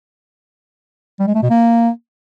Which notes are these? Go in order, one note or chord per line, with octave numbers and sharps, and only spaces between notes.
G3
G#3
A3
B2
A#3